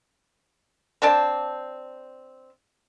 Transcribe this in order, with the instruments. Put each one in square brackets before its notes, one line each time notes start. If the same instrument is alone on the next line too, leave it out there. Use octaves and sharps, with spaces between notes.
[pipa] C4 D4 D5 A5